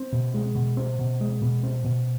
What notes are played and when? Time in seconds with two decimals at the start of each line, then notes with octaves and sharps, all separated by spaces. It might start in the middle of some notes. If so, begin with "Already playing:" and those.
Already playing: C4
0.12 B2
0.34 G#3
0.55 B2
0.77 C4
0.99 B2
1.21 G#3
1.42 B2
1.63 C4
1.84 B2